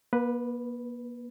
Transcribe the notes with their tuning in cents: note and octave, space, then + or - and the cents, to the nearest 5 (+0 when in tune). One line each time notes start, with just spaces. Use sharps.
A#3 +45 B4 +0